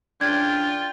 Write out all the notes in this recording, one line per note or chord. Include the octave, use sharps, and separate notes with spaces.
C#3 E3 D4 F4 G5 G#6